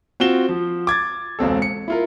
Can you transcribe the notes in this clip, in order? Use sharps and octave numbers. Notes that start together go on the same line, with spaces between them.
C4 F4 F#4 E7 G7
F3
D6 G#6 A6
E1 C#2 C4 A4
C#7
E4 F4 A#4